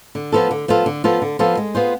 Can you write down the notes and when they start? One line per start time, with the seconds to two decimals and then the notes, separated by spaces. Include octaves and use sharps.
0.15 D3
0.32 F3 B3 F4 A4
0.51 D3
0.68 F3 B3 F4 A4
0.86 D3
1.04 F3 B3 F4 A4
1.22 D3
1.39 F3 B3 F4 A4
1.57 G#3
1.75 B3 F4 G#4 C5